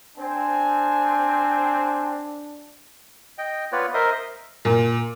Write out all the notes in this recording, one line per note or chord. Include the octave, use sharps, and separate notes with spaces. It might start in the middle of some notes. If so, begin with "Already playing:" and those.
C4 D4 G#5
D#5 G5
B3 F4 B4 C#5 D5
A#4 C5 D#5 E5 C6 D#6
A#2